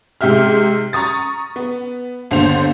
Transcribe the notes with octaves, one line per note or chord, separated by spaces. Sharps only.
G#2 C3 G4 E5 F6
A#5 C#6 D#6 A6
B3
G1 D#2 D3 C5 F7